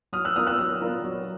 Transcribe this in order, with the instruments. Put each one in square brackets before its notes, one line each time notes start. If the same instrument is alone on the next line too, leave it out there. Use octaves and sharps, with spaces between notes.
[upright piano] F#3 [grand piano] D#6 F6
[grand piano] E6 F#6
[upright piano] B3 D4 F4 A#4 [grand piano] D#6 F6
[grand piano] E6 F#6
[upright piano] F#3
B3 D4 F4 A#4
F#3